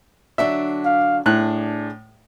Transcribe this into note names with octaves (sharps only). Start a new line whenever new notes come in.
D3 F#3 D4 E5
F5
A2 D4 G#4 F#6